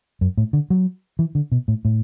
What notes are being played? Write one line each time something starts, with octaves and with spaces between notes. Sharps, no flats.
F#2
A2
D3
F#3
E3
D3
B2
A2
A2